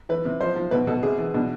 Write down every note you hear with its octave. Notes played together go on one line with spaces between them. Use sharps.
E3 B4
C3
F3 C5
F3
B2 B4
B2 A4
C3 G#4
E3
B2 D4